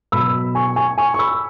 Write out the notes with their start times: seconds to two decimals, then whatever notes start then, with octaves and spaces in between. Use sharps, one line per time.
0.12 B2 F#3 B5 E6
0.55 G#5 C#6
0.76 G#5 C#6
0.98 G#5 C#6
1.14 C#6
1.19 B5 E6